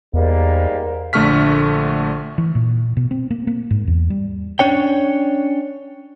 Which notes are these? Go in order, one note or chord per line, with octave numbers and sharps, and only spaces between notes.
E2 G#2 G3 A#3
A#1 D3 A3 C#6 F6 B6
E3
A#2
B2
C4
A#3
A#3
G#2
E2
G3
C#4 D4 C#5 G5